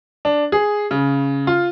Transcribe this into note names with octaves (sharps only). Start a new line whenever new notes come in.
D4
G#4
C#3
F4